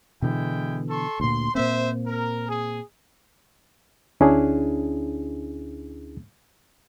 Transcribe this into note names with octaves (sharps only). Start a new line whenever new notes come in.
B2 D3 E3 G#3 E4 G5
A4 C6 C#6
D2 A#2 C6
A#2 A#3 C4 C5 E5
A#4
G#4
D2 C#4 D4 E4 G#4